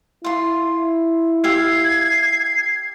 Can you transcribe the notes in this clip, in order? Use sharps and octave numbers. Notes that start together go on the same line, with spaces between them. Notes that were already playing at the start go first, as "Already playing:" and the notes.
E4 F4 C6
G4 E5 F5 G#6 C7